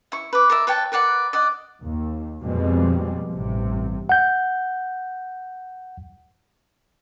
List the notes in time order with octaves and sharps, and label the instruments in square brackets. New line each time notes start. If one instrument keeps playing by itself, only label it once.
[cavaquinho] E4 C#6
B4 D6
A#4 D5 E5
B4 C#5 G5 A5
A#4 B4 D5 F#5
D5 D#5 F#5
[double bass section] D#2
F2 B2 G3 G#3 C4
A1 G2 C3
[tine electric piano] F#5 G6